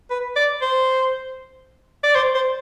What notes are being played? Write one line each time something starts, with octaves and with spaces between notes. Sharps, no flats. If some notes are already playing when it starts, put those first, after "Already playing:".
B4
D5
C5
D5
C5
C5